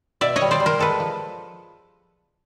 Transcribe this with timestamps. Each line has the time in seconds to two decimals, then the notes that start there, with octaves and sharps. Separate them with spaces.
0.21 B2 D5 E5
0.36 C#5 D#5
0.41 G3
0.51 C5 D5
0.60 G3
0.66 A#4 C5
0.79 G#3 A4 B4
1.00 F3